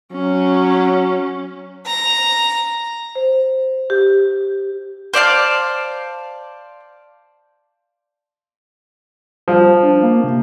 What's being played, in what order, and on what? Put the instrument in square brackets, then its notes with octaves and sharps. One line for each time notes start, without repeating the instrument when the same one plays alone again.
[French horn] F#3 [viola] C#4
[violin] A#5
[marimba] C5
G4
[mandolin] C5 D5 F5 A5
[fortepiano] F3 [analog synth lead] G3
[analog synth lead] D4
A#3
C3